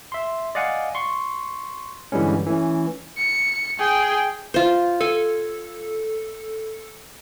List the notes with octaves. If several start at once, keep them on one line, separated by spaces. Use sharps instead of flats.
E5 C6
D5 D#5 F5 F#5 G#5
C6 C#6
G2 D3 E3 G3 G#3 C#4
E3 A3 C#4
C#7
G#4 G5
F4 C5
A4 G#5